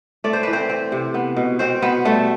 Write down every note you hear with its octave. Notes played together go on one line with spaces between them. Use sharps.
A3 D5
C5
E3 B4
C4 C5
C4
C3
B3
B2
B2 C4 C5
B2 B3 B4
G3 A3 A4